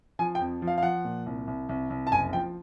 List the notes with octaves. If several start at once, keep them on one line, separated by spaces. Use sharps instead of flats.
F3 G#5
G5
F2
F3
F5
F5
F3 F#5
A#2
C2
C2
C2
C2
A5
F#1 G#5
F3 G5